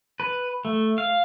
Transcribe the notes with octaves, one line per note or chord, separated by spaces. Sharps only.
B4
A3
F5